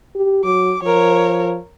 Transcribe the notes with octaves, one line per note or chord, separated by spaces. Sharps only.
G4
F#3 D6
F3 A#4 C#5